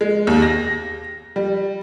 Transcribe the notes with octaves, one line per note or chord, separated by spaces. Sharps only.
G#3
D#2
A#6
G3